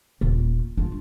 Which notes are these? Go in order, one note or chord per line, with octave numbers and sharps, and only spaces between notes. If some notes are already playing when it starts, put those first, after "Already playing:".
D#1 A#2
D4 F4